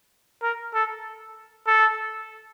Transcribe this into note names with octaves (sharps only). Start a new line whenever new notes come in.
A#4
A4
A4